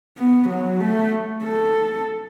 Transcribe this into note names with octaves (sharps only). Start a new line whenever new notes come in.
B3
F#3
A3
A4